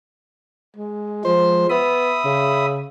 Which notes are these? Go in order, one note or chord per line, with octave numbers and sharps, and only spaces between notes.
G#3
F3 G#3 C5
B3 E5 B5 D#6
C#3